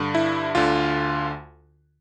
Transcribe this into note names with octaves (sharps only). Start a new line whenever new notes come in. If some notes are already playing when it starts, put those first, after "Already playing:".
Already playing: G2 D3
E4
D2 D3 F4